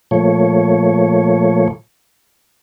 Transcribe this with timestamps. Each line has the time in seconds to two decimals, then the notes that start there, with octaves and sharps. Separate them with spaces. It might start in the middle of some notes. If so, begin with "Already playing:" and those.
0.11 A#2 F3 A3 C#5